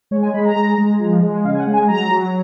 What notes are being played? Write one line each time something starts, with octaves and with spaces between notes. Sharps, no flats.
G#3 C#5
G#5
G#3 B5
A#5
G#3
G#3
F3
G#3
C#3 F5
G#5
F#5
G#3
G#5
F#3 A#5
F#3